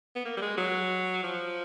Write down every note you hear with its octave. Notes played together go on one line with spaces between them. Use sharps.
B3
A#3
G3
G#3
F#3
F3